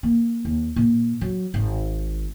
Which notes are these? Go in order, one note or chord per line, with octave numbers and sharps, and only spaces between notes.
A#3
D#2
A#2
F#3
G#1